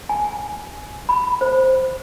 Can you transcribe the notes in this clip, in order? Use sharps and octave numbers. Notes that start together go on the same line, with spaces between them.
G#5
B5
C5